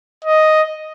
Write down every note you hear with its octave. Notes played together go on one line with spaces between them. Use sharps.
D#5